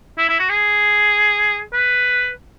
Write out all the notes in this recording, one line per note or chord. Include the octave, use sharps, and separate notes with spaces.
E4
E4
F#4
G#4
B4